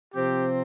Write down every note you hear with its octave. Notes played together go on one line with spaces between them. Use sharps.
C3 F3 C4 G4